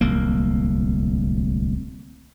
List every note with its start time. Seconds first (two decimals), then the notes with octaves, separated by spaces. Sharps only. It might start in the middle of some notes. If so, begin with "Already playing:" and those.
0.01 D1 C2 A#3